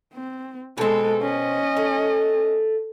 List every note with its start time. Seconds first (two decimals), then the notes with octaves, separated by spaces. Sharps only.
0.14 C4
0.78 B2 G#3 C4 A4
1.22 C#4 D#5
1.77 A3